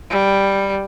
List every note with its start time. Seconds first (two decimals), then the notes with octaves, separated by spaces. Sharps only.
0.10 G3